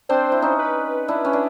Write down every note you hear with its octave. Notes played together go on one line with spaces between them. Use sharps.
C4 D4 C5
E4
C#4 D#4
B4
D4 E4
C#4
D4